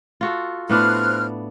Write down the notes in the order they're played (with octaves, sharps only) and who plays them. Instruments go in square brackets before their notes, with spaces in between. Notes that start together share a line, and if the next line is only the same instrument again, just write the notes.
[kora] F4 F#4 A4
[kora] A2 B3 D4 [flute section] C5 F6 F#6